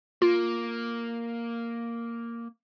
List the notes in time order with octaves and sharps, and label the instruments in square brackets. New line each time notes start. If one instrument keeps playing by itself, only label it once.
[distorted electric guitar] A#3 [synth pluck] F4